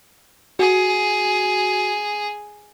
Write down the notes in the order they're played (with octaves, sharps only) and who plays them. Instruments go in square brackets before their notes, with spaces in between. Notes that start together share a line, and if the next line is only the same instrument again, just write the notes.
[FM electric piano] F#4 [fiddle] G#4